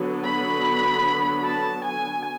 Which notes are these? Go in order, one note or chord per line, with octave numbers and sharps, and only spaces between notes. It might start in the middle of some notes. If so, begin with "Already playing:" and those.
Already playing: D3 F#3 B3
B5
A5
G#5